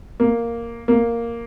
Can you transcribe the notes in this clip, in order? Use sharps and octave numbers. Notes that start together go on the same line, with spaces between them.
A#3
A#3